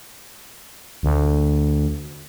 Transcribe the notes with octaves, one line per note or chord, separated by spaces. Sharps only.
D2